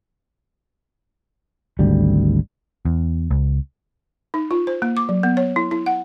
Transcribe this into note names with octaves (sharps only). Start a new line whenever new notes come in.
G#1 D2 G3
E2
C#2
D#4
F4
C5
A#3
D6
F#3
B3
C#5
E4
E4
F#5